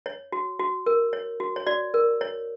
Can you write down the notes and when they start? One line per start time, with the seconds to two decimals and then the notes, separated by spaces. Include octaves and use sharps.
0.06 C#5
0.32 F#4
0.59 F#4
0.86 A#4
1.13 C#5
1.40 F#4
1.56 C#5
1.67 F#4 D5
1.94 A#4
2.21 C#5